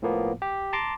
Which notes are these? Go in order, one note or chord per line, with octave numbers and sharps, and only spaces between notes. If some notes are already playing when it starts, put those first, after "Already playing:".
A2 F3 A#3 B3
G4
A5 A#5 C6 D6